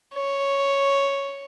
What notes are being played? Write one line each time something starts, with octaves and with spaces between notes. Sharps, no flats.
C#5